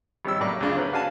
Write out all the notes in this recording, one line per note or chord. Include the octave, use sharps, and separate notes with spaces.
G#1 G3 C#4 G4 E6
A2 F#3 A#3 D5 C#6
D2 C#3 G#3 D4 F4 D5
C4 C#4 E4 A#4 B4
D4 F#4 F5 G#5 A5